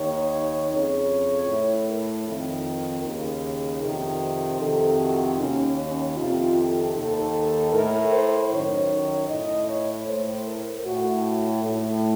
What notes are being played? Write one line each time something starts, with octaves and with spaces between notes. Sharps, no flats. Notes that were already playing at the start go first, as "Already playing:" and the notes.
Already playing: D#2 D#3 C#5
F2 C#3 C#5
A2
A#4
F2 D#3
D#2 C#3 A#4
F2 C3 D#3
C5
F2 C3 D#3 A4
F#4
D#2 D#3 C#4
C#4
F2 C3 D#3 F4
A4
D#2 D#3 A4
A2 A#4
C5
F#2 D#3 C#5
A2 D#5
C#5
A2 C5
A#4
A2 F#4
A2